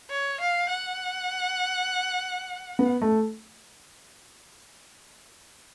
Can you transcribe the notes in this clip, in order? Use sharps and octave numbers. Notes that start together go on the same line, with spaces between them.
C#5
F5
F#5
B3
A3